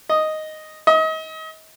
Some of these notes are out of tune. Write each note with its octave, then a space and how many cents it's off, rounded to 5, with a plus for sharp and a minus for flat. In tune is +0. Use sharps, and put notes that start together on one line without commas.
D#5 +0
D#5 +35